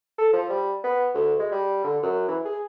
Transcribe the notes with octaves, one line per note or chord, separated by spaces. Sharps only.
A4
F3
G3
B3
D2
G#3
G3
D3
F#2
E3
G#4